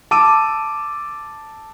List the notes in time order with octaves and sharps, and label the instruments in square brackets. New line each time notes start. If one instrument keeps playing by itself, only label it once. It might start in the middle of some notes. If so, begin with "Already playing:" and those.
[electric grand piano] A5 D6 E6 D#7